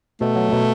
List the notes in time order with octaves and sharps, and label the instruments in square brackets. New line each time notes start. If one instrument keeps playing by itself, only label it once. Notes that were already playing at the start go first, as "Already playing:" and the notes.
[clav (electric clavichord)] B2 [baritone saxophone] A3
[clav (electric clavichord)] F#3
B2